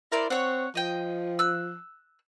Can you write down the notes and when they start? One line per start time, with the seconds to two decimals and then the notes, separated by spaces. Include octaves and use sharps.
0.12 E4 A#4 C5 D5
0.30 C4 C#5 F#5
0.75 F3 D#5 G5
1.39 E6 F#6